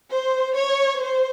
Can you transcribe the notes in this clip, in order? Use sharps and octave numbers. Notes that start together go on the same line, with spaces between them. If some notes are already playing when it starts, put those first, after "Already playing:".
C5
C#5
C5